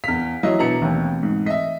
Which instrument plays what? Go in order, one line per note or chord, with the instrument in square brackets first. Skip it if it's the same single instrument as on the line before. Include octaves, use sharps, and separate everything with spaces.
[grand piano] E2 B6 [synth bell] F5 F6
[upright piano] E3 F#3 [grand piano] C#5 D#5
[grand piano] B2 A#5 C#7 [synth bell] D4 B4
[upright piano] D#2 [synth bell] E3 A3 C4
[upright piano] G#2
[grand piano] D#5 E5 [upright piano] B6